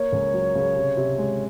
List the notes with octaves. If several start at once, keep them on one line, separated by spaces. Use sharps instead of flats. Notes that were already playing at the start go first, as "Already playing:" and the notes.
Already playing: A#3 C#5
C#2
F#3
C#3
C3
C3
G#3